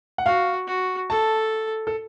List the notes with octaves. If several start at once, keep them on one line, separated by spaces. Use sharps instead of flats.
F#5
F#4 F5
F#4
A4 A5
A4